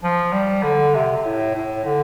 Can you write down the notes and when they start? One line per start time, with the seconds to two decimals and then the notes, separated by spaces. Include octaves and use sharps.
0.03 F3
0.33 G3
0.63 D3
0.95 C3
1.17 C3
1.25 A2
1.56 A2
1.85 D3